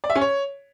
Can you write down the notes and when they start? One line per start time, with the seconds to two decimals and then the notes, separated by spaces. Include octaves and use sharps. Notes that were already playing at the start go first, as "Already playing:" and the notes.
0.04 D5
0.10 E5
0.16 C#4
0.21 C#5